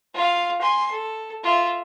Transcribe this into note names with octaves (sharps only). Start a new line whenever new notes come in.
F4 F5
G#5 C6
A4
F4 E5